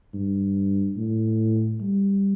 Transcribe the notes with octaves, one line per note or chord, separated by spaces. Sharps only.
G2
A2
G3